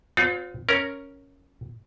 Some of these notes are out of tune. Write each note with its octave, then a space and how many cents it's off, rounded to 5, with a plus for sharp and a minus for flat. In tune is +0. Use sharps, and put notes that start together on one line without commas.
C4 -35 F4 +35 C#5 +25
C#4 +0 A#4 +0